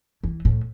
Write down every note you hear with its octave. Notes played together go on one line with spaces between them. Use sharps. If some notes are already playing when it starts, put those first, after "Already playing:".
E3
A2